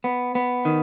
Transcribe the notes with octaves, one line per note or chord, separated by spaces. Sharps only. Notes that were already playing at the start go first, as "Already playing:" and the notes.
B3
B3
D#3